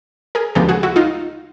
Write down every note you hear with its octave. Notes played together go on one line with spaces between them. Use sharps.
G#4 A#4
D2 C#3 F3 G#3 B3 G4 A4
F#4 G#4
E4 F#4
D#4 F4